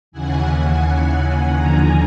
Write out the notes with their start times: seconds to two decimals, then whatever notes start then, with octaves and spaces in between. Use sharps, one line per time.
0.12 D#2 C#3 E3 F#5 G#5
1.54 D#2 D3 F3 G#5 A#5